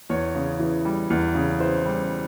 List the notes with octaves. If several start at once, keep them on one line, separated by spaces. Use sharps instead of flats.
E2 C#5
C#3
E3
G3
E2
C#3
E3 C5
G3